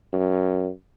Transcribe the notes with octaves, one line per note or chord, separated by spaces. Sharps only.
F#2